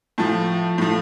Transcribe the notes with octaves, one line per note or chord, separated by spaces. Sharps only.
A2 F3 A5
A2 F3